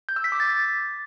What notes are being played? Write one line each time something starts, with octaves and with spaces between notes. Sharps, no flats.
G6
E6
B6
D6
A6